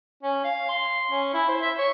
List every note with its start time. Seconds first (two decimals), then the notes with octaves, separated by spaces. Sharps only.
0.23 C#4
0.44 F5
0.69 C6
1.10 C#4
1.33 E4
1.48 C5
1.62 E5
1.78 C#5